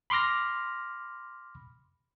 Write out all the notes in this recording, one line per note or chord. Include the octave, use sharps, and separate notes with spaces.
B5 C6 D6 F6 A#6